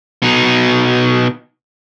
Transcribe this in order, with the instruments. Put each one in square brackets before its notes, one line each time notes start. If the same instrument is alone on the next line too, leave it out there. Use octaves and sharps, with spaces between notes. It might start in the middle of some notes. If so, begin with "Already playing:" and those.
[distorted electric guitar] B2 D#4